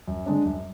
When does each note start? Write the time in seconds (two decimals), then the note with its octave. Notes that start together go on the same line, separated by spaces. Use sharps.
0.08 F#2
0.26 D3 G#3 D4
0.45 F#2